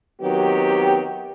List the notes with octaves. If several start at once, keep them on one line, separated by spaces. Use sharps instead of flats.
D#3 F#3 B3 C4 G4